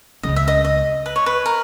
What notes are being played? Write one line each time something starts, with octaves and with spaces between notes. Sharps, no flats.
C#2 C#3 G3 C#4 D#5
E5
D#5
D#5
B4
C#5
B4
A#4